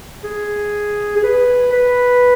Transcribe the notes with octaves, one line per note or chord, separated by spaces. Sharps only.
G#4
G#4
B4
B4